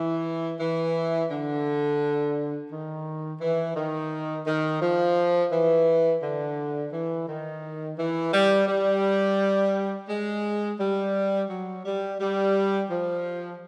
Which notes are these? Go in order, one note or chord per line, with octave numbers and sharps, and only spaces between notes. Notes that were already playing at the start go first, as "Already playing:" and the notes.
Already playing: E3
E3
D3
D#3
E3
D#3
D#3
F3
E3
D3
E3
D#3
E3
G3
G3
G#3
G3
F#3
G3
G3
F3